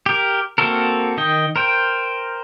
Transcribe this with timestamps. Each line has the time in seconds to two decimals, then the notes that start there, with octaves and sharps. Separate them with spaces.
0.06 G4 A#4
0.58 A#3 C4 F#4 A4 A#4
1.17 D#3 D#5 G5
1.56 A#4 C5 G5